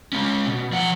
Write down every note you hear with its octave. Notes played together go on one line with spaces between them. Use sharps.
G#3 C#4
B2
F3 F#5